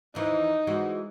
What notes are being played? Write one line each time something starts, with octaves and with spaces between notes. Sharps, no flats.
D#2 E3 D#4
E3 G#3 F#4